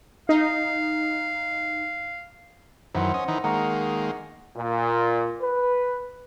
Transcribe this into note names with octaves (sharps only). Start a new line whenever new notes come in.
D#4 F5
F#2 D#3 E3 C5 F#5 C6
C#4 D#5
D#3 E3 D#4
D#3 G#3 A#3 F#5 A#5 C#6
A#2
B4